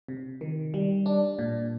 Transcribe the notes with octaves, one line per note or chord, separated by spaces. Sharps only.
C3
D#3
G3
D4
A#2